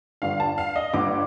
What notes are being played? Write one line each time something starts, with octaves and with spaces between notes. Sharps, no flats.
G1 G2 D3 F5
A5
F5
D#5
G1 G2 D3 D6